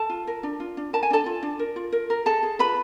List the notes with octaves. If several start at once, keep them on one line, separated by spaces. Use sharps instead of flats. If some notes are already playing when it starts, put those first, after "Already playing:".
Already playing: A4 A5
F4
A#4
D4
F4
D4
A#4 A5
G#5
D4 A4 A5
F4
D4
A#4
F4
A#4
A#4
G#4 A4 A5
G#4
F4 B4 B5